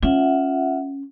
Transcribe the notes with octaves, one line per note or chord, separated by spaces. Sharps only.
C#4 F4 E5 F#5